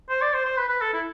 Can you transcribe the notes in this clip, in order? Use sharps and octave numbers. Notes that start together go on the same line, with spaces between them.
C5
D5
C5
C5
B4
B4
A4
E4